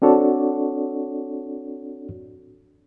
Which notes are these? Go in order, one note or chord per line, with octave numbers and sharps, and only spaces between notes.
C4 D4 F#4 A4 C#5 D5